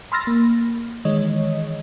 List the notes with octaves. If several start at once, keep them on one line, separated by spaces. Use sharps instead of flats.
B5 C6 E6 F6 A6 A#6
A#3
D#3 E3 G#3 C#5 D#5